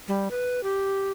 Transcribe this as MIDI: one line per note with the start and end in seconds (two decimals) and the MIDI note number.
0.08 0.28 55
0.31 0.63 71
0.63 1.12 67